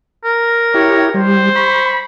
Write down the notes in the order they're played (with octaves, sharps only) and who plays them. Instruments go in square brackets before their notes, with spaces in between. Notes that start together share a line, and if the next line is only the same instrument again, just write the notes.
[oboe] A#4
[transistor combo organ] E4 G4 [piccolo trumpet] C#5
[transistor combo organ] G3 [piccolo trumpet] C5
[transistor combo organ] B5 [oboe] C#6